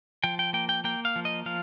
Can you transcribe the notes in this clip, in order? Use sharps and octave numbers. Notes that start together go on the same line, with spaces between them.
F3 G5
G5
A#3 G5
G5
A#3 G5
F5
F3
D#5
F3 F5